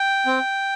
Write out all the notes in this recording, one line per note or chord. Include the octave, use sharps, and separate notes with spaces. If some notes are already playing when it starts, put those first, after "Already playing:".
Already playing: G5
C4